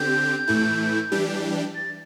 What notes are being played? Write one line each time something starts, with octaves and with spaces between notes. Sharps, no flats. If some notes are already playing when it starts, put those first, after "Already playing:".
Already playing: D3 C4 G4 G6
A2 E3 A3 E4
E3 G3 D4 G4
A6